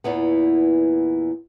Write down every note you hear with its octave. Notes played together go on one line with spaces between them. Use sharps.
E2 A#2 E3 B3